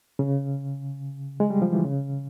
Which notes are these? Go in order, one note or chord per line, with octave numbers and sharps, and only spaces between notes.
C#3
G#3
G3
F3
E3
C#3